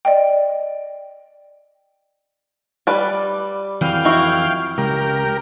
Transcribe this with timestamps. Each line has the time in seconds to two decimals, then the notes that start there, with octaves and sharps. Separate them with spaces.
0.05 D5 D#5 G5
2.87 G3 B4 D5
3.81 F2 E3 F#3 F5 G5
4.05 E4 F#4
4.78 C#2 G4 A#4